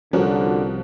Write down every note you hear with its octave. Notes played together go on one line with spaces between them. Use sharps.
C2 D3 F3 G3 C#4 F#4 A#4